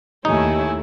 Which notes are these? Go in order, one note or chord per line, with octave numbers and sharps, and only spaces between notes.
D#2 D#3 A3 D#4 E4 G4 C#5 G#5